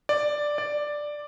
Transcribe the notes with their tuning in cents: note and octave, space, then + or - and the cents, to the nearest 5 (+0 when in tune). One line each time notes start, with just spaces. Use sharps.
D5 +5
D5 +5